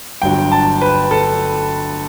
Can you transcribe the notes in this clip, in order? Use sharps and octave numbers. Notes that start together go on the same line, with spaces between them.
G1 G2 F#3 G5
A5
B4
A4